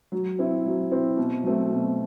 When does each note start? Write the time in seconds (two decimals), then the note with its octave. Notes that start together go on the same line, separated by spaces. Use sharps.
0.12 F#3
0.39 C4 E4
0.66 F#3
0.92 C4 E4
1.17 B2
1.44 F#3 A3 C4
1.71 B2